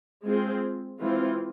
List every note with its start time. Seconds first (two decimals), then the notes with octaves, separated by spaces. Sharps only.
0.25 G#3 C4 F4 G#4
1.00 E3 G#3 C4 F4